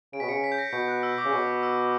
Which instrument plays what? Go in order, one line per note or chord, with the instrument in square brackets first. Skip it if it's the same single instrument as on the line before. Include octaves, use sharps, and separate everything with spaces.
[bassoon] C#3 [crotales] D7
[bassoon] B2 [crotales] B6
[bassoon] C#3 [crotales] C#7
[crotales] B6
G6
A#6
[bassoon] B2 [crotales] G6
[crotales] F#6
E6
D6
[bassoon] C#3
[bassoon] B2 [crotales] C#6
[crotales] E6